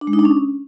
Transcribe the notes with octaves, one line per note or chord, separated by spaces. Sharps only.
D4
G#3
D#4
D4
C#4